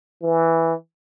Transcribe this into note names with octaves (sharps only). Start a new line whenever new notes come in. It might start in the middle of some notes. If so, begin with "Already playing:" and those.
E3